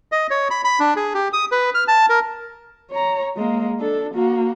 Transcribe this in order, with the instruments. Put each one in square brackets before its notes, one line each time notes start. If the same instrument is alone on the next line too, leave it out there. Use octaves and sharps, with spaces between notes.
[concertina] D#5
C#5
B5
B5
D4
G#4
G4
D#6
B4
F6
A5
A#4
[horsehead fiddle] C#5 A#5
G#3 A#3
D4 A4
A#3 F#4